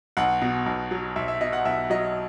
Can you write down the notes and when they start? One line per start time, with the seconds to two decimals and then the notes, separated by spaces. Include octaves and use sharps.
0.17 B1 F#5
0.42 B2
0.66 B1
0.91 F#3
1.16 B1 E5
1.28 E5
1.41 B2 D#5
1.53 F#5
1.65 B1 E5
1.90 F#3 D#5